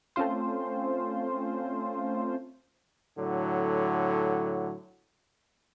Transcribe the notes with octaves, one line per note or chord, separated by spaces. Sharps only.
A3 C4 C#4 F4 C5
A2 D3 F#3